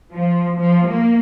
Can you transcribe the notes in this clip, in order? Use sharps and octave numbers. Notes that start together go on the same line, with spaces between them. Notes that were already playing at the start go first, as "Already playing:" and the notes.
F3
F3
A#3